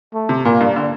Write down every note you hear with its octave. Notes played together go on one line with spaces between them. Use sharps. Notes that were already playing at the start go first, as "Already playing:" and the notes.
A3
C3
A#2 A#3
G2
D3